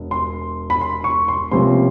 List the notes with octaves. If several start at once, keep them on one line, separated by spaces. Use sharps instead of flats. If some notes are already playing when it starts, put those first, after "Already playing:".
Already playing: E1
C6
B5
C6
C#6
C6
C#2 C3 F3 A#3 C#4 C6